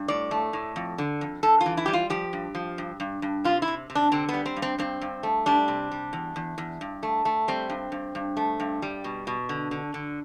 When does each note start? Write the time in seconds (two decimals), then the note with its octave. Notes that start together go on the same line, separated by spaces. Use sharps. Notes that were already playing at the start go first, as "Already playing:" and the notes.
Already playing: G2
0.08 A2 D5
0.31 A3
0.53 A2
0.76 F2
0.98 D3
1.21 F2
1.43 G2 A4
1.61 F4
1.66 E3
1.77 E4
1.86 G3 G4
1.93 F4
2.10 F3 G4
2.33 G2
2.55 F3
2.78 G2
3.00 G2
3.22 G2
3.44 C3 F4
3.62 E4
3.68 C3
3.90 C3
3.95 D4
4.12 D3 C4
4.29 B3
4.34 G3
4.46 C4
4.56 G2
4.62 C4
4.78 G2 C4
5.01 G2
5.23 A3
5.46 G3 D4
5.68 C3
5.91 G3
6.13 E2
6.36 E2
6.58 E2
6.81 G2
7.03 A3
7.25 A3
7.48 G3 C4
7.70 G2
7.92 G2
8.15 G2
8.37 A3
8.60 G2
8.82 G3
9.04 B2
9.27 B2
9.49 D3
9.71 D3
9.94 D3